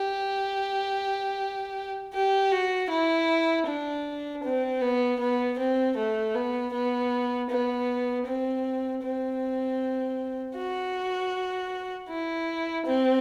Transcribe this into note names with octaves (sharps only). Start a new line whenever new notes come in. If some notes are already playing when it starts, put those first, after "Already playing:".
Already playing: G4
G4
F#4
E4
D4
C4
B3
B3
C4
A3
B3
B3
B3
C4
C4
F#4
E4
C4